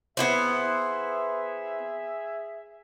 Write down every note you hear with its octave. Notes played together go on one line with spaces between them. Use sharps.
B3 E4 G#4 C5 E5